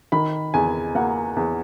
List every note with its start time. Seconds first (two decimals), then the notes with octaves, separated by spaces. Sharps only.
0.12 D#3 B5
0.54 E2 G#5
0.95 A#3 F#5
1.37 E2